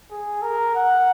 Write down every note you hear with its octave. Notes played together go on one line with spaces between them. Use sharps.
G#4
A#4
F#5